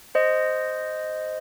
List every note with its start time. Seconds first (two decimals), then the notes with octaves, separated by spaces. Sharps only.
0.15 C5 D#5